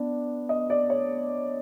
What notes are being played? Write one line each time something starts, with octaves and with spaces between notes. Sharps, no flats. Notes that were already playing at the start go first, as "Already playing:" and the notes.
Already playing: B3 D4 D5
D#5
D5
C#5